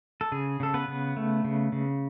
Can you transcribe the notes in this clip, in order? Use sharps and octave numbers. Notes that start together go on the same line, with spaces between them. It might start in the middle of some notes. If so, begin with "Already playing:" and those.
A4
C#3 G#4
C#3 A4
B3 B4
C#3
A3
C#3
C#3